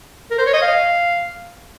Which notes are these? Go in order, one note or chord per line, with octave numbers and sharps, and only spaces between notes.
A#4
C5
C#5
D#5
F5